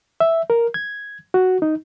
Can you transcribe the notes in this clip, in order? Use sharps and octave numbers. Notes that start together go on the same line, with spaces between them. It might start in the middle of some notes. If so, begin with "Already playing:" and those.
E5
A#4
G#6
F#4
D#4